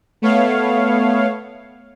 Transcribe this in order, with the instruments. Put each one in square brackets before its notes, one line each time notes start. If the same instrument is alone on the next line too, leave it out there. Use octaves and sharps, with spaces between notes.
[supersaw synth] A3 B3 C#5 F5